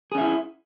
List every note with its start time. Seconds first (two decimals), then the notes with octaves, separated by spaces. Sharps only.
0.12 G#4
0.15 C#4
0.18 E5
0.21 E4